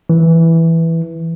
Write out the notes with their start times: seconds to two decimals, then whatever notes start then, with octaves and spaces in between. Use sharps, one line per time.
0.10 E3